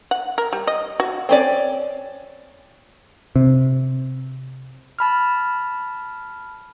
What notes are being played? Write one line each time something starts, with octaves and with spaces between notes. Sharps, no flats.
F#5
A#4
G3
D#5
F#4
C4 C#4 D5
C3
A5 B5 F6